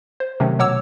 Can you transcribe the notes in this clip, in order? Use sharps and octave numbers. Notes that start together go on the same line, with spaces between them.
C5
C3 D#3 F#3 A3 C#4
B2 F#3 C#5 F#5 D6 E6